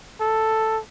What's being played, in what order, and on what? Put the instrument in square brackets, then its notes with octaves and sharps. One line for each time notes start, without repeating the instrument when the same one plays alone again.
[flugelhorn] A4